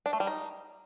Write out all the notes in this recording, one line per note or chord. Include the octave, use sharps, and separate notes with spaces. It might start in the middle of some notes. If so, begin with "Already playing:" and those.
D4
A3
G3
D#4